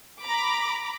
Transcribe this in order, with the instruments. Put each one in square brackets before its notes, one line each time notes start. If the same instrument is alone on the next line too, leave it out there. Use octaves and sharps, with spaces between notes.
[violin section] A#5 B5 D6